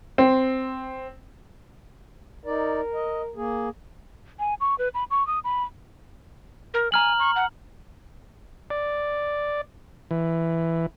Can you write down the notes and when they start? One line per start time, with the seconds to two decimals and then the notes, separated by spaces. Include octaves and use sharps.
0.18 C4
2.46 D#4 A#4 D5
2.94 D#5
3.36 A#3 G#4
4.39 G#5
4.60 C#6
4.78 B4
4.94 B5
5.10 C#6
5.27 D#6
5.44 B5
6.74 A#4
6.92 G#5 A#5 F6 F#7
7.19 C#6
7.36 F#5
8.70 D5
10.11 E3